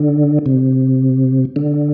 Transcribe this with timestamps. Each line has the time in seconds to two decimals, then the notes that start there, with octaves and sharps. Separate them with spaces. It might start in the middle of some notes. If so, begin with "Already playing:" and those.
Already playing: D3
0.46 C3
1.56 D3